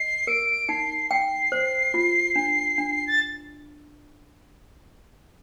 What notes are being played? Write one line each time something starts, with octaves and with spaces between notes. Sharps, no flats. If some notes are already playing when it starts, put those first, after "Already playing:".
Already playing: D#5 C7
A#4 D7
D#4 C7
G5 C7
C5
F4
D4
D4
A6